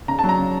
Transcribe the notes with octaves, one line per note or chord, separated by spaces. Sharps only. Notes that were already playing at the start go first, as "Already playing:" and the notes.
C#3 A#5
A5
F#3
A#5
C#3